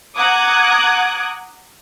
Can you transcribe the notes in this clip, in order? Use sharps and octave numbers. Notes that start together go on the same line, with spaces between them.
F#5 A#5 D6 D#6 F#6 G#6